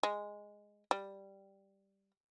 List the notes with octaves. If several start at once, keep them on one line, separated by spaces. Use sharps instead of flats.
G#3
G3